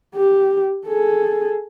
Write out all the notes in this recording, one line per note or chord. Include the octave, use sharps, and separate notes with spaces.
G4
G#4 A4